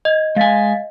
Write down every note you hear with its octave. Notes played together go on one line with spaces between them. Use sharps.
D#5 G#6
G#3 F5 G#5 A6 B6